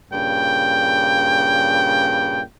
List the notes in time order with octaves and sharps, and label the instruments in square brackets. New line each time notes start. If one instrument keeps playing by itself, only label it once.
[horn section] G2 A#2 C#3 G5